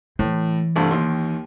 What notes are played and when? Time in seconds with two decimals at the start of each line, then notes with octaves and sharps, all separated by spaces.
0.19 A2 E3
0.76 C2 G2 A3
0.91 D#2 D#3 C6